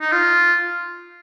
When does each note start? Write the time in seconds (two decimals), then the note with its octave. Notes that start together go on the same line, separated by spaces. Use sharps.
0.01 D#4
0.12 F4